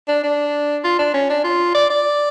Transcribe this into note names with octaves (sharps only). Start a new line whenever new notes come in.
D4
D4
F4
D4
C#4
D4
F4
D5
D5